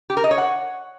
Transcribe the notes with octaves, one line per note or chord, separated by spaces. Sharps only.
G4
A#4
D#5
C#5
F#5